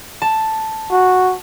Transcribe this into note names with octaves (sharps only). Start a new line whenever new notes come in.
A5
F#4